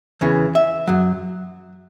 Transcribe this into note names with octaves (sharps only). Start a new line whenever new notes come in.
E2 C#3 E3
E5
F#2 F#3